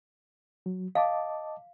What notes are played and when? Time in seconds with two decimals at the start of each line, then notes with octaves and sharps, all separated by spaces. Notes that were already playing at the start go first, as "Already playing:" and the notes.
0.66 F#3
0.95 D#5 F5 A5 D6